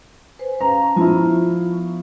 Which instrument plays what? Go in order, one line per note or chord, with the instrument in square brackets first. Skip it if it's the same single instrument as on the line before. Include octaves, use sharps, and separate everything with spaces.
[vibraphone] B4 C5 G#5
[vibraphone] C#4 F5 [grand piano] A#5
[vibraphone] A5 C#6
[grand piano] F3 E4 [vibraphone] B3 F4 C#6